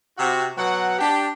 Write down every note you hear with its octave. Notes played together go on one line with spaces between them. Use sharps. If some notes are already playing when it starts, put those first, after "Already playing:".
C3 F#4
B2 F#3 F#4 F#5
D4 G4